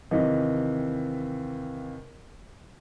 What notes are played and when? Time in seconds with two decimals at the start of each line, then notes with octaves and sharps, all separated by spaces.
0.11 D#2 C3 E3 D#5